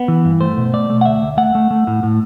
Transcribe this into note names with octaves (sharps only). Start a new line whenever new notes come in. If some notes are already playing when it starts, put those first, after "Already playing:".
Already playing: B3
E3
G2
A3 C5
B2
A3 D5
A3
F#5
D2 E5
D2
A3 F#5
A3
A3
A2
A2